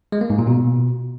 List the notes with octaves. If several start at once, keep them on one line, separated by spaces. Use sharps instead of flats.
G#3
A#3
G#2
A#2
B2